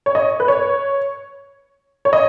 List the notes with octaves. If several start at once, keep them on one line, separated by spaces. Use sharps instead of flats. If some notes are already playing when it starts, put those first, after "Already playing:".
C#5
D#5
B4
C#5
C#5
D#5